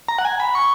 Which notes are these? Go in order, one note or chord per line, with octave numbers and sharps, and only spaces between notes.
A#5
F#5
G#5
B5
C#6